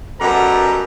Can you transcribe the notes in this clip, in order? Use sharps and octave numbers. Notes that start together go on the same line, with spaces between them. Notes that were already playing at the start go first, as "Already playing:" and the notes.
F#2 B2 G3 A4 A#4 A#5